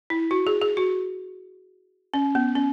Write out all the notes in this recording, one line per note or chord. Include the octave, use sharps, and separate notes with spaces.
E4
F#4
G#4
G#4
F#4
C#4
B3
C#4